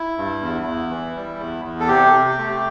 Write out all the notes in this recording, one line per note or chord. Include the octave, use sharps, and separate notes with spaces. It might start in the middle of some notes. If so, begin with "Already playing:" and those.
Already playing: E4
G2
E2
E2
E3
G3
E2
E2
A4
C3 G4
C3
A3